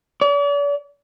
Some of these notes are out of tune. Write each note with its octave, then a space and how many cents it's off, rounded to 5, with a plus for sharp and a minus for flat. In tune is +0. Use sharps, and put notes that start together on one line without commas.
D5 -45